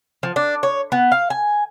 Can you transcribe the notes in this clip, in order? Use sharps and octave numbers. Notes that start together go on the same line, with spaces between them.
F3
D4
C#5
B3
F5
G#5